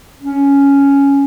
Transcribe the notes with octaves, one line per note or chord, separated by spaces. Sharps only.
C#4